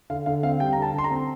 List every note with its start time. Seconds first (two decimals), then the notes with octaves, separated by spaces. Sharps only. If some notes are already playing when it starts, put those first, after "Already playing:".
0.10 D3 F5
0.26 D3 F5
0.43 C4 F5
0.60 G3 G5
0.73 D3 A#5
0.82 A5
0.93 D3 C6
1.04 A#5
1.11 C4